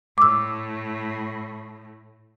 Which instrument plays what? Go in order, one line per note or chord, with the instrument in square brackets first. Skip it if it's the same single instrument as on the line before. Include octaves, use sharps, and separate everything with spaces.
[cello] A2 [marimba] D6 E6